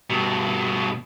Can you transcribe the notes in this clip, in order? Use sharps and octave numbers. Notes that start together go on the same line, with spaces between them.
G2 B2